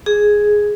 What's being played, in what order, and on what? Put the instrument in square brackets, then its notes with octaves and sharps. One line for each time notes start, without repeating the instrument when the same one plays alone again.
[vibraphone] G#4